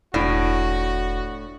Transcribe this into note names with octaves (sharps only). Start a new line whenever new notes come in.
E1 A2 D4 F#4